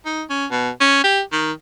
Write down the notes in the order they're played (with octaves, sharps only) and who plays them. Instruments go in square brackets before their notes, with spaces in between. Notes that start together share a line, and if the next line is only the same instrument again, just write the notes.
[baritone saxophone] D#4
C#4
B2
C#4
G4
D#3